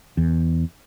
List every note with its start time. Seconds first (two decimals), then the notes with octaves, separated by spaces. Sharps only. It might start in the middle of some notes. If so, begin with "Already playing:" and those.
0.17 E2